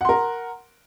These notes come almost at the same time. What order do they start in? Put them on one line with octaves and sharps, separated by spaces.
F#5 C6 A#4